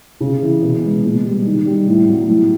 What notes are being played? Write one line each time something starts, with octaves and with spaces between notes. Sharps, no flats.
C#3
E3
B2
G#3
A#2
G3
D#3
G3
A2
F#3
A2